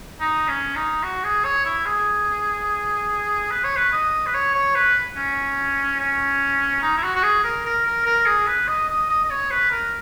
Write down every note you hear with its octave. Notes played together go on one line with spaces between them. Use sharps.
D#4
C#4
D#4
F#4
G#4
C#5
E4
G#4
B4
C#5
B4
D#5
B4
C#5
C#5
B4
C#4
C#4
D#4
E4
F#4
F#4
G#4
A#4
A#4
A#4
A#4
G#4
B4
D#5
D#5
D#5
D#5
C#5
B4
A#4